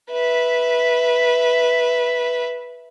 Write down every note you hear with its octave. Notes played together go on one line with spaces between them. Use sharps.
B4 E5